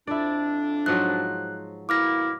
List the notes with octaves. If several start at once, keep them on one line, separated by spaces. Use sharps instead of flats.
F2 D4 E4 D5
G#2 F3 F#3 F#6
B2 A#3 E4 D6 F6 A#6